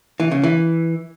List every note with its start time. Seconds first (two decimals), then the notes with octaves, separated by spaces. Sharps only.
0.20 E3
0.32 C#3
0.44 E3